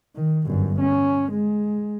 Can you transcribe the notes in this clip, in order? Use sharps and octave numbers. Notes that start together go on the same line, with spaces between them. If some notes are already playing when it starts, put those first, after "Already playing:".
D#3
G1 F#2
C#4
G#3